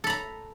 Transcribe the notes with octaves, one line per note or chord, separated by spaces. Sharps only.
A4 A#5 B5